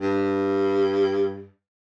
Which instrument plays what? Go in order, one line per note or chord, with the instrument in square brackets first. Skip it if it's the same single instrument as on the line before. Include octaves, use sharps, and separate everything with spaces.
[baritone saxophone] G2